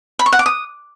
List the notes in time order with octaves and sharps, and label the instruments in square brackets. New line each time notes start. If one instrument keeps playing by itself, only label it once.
[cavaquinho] B5
C#6
F#5
D6
D#6